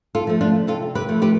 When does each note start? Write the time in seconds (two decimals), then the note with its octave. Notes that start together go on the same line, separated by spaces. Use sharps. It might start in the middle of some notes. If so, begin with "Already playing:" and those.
0.15 F4 A4
0.27 F3 A3
0.41 D4 F4
0.67 C3 F4 A4
0.95 G4 B4
1.09 F3 A3
1.22 G4 B4